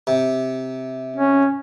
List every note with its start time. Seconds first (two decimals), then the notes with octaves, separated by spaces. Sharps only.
0.07 C3
1.16 C#4